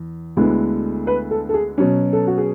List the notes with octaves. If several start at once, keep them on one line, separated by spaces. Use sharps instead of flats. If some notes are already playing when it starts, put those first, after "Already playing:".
Already playing: E2
D2 D3 G#3 B3 E4
B4
A4
A4
G#4
B2 F#3 C#4
A4
F#4
G#4